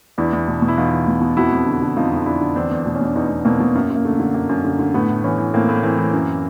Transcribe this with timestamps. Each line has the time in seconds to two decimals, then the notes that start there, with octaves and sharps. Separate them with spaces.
0.18 E2 D4 E4
0.33 E2
0.48 B2
0.62 B2
0.68 E4
0.78 E2 D#4 F4
0.92 E2
1.07 B2
1.22 B2
1.37 F2 E4 F#4
1.52 F2
1.67 D3
1.82 D3
1.96 F2 D#4 F4
2.11 F2
2.17 F4
2.26 D3 D4 E4
2.41 D3
2.56 E2 C4 D4
2.71 E2
2.86 B2
2.95 C#4
3.01 B2 D4
3.16 E2 C#4 D#4
3.30 E2
3.45 B2 A#3 C4
3.60 B2
3.75 F#2 A#3
3.90 F#2
3.96 A#3
4.05 D3 A3
4.20 D3
4.34 F#2 A#3
4.49 F#2
4.65 D3
4.79 D3
4.94 A2 A3 B3
5.09 A2
5.24 E3 B3 C#4
5.38 E3
5.54 A2 A#3 C4
5.69 A2
5.83 E3 A#3 C4
5.98 E3
6.13 F#2